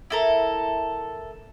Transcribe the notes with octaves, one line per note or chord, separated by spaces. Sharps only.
E4 A4 A#4